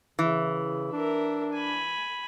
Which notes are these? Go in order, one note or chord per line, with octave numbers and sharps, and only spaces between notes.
C#3 E3
D4 A#4 E5
G#5 B5